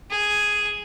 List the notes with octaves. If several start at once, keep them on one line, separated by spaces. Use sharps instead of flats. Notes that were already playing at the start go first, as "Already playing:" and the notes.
G#4